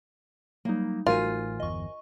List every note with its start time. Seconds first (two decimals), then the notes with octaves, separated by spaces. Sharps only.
0.65 F#3 G3 A#3 D#4
1.07 A1 A3 D#4 F4 F#4 A#4 C5 G#5
1.60 G1 E2 D#5 C#6